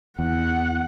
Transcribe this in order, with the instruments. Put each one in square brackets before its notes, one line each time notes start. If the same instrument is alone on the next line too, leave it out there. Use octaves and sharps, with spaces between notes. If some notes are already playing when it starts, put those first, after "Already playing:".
[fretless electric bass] E2 [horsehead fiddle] F#5